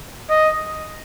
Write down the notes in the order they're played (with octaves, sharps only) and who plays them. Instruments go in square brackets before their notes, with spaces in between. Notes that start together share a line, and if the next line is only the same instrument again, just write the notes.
[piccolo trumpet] D#5